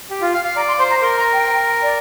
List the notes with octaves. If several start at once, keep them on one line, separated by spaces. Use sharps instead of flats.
G4
F4
F5
F5
D5 A#5
C6
C5 C6
A#5
A#4 C6
A#5
G5
D5